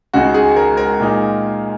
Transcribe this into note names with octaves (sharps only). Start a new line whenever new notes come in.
C#2 C#3 G#3 D#4 F#4
G#4
A#4
A#4
A#2 G#3 D#4